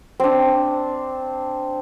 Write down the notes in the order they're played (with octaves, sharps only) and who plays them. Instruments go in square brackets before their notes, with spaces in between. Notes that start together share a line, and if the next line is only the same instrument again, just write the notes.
[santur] C4 D4